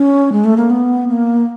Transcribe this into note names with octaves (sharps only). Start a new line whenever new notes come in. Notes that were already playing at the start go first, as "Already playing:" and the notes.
Already playing: C#4
G#3
A3
A#3
B3
A#3